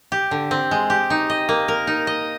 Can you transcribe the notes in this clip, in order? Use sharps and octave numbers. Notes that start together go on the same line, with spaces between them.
G4
D3
C4
G#3
G4
D#4
D#5
A#3
A#4
D#4
D#5